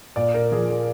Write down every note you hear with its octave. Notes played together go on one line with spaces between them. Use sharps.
A#2 D5
A#4
F3 G#4
A#4